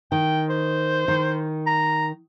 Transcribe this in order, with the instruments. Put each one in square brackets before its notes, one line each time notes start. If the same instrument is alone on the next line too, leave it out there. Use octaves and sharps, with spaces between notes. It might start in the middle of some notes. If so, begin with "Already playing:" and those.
[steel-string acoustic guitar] D#3 [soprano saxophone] G5
[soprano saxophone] C5
[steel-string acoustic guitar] D#3
[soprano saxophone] A#5